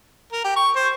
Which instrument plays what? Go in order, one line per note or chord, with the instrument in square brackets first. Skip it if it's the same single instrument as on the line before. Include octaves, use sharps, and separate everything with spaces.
[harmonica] A#4
G4
C#6
C5